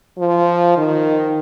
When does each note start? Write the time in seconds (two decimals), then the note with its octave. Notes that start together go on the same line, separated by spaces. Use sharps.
0.18 F3
0.78 D#3